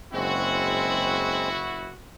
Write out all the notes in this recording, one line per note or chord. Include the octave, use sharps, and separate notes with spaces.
F#1 G#3 C4 E4 F#4